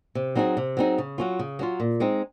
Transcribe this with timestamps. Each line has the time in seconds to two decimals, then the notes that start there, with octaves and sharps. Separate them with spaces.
0.15 C3
0.36 F#3 C4 D#4 G#4
0.57 C3
0.77 F#3 C4 D#4 G#4
0.98 C#3
1.18 F#3 C#4 F4
1.39 C#3
1.59 F#3 C#4 F4
1.80 A#2
2.00 G#3 C4 D#4